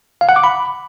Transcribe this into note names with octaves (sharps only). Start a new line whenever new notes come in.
F5
F#5
D6
B5